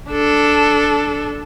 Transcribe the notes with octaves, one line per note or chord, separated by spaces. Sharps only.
D4 A4